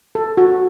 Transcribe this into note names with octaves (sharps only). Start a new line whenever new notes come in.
A4
F#4